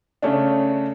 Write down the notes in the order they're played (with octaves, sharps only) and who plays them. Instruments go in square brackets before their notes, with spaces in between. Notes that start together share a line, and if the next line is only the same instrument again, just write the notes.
[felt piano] C#3 A3 C#4 D4